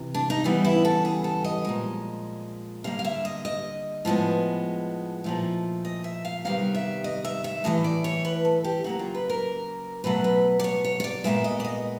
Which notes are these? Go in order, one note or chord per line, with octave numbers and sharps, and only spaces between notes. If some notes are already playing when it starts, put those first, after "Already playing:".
Already playing: C3 E3
D4
D#4
C#3 E3 G3 B3 D#4
E4
A4
G#4
A4
D#5
A#2 F3 G#3
D3 G3 A#3 F5
F5
E5
D#5
D#5
A2 F3 G#3 B3
A#2 F3 A3
D#5
E5
F5
C3 D#3 G3 B3 F5
E5
D#5
E5
E5
A2 E3 A3 D#5
D5
C#5
B4
A4
G4
C#3 F#3 A#3 F#4
F4
B4
A#4
B2 F#3 A3 B4
B4
D5
C#5
C#5
C#5
D5
A#2 F3 G#3 B3 E5
D#5
D5
D#5